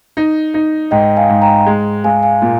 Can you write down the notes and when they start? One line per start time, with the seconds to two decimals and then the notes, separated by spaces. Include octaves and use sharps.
0.17 D#4
0.54 D#4
0.91 G#2 D#5 G5
1.17 F5 G#5
1.29 G#2
1.42 G5 A#5
1.66 G#3
2.04 G#3 F5 G#5
2.23 F5 G#5
2.42 A#2